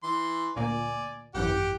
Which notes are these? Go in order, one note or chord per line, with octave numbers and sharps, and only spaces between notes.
E3 C6
D2 A#2 A#3 D5 G#5
G#1 F#2 E3 G4 F#5 G5